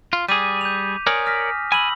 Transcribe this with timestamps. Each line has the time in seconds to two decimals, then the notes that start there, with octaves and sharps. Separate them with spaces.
0.13 F4
0.29 G3 G#4 D6 B6 D#7
0.61 G6 F7
1.07 A#4 C#5 D5 G#5 D#6
1.26 F6 A#6 B6
1.72 G#5 B5 E6 F#7